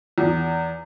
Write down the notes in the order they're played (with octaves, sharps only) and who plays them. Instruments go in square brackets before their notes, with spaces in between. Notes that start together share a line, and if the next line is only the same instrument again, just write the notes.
[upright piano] E2